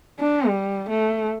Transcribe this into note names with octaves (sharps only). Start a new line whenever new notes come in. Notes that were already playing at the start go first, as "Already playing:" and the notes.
D4
G3
A3